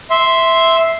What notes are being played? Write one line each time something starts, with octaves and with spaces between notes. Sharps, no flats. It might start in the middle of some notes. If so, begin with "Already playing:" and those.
E5 C6